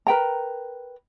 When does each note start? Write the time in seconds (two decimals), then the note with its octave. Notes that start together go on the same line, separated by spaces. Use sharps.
0.07 A#4 B4 G5 A#5